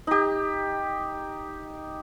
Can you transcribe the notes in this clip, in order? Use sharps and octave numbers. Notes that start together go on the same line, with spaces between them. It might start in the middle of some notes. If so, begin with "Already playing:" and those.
D#4 G4